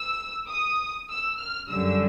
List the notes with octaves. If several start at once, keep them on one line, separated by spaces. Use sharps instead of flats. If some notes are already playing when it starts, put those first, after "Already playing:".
Already playing: E6
D#6
E6
F6
F#2 D3 G3 E6